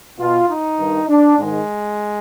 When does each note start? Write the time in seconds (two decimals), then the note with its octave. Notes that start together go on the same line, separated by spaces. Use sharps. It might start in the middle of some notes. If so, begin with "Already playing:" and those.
0.18 B2 F4
0.49 D#4
0.79 G2 D#3
1.09 D4
1.39 G#2 D#3 G#3